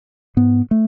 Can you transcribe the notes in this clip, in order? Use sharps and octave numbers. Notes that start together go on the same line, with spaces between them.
G#2 B3
A3